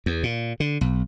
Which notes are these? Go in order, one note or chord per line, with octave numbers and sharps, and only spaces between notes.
E2
A#2
D3
B1